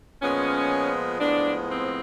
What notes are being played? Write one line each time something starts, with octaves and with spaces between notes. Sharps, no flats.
A#2 F3 G#3 B3 C#4
A2 F3 G#3 B3 D4
C4